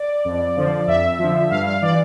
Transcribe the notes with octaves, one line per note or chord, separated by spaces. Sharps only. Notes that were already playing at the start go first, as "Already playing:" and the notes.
Already playing: D5
F2
D3 F3
F2 E5
D3 F3
G2 F5
F5
E3 D5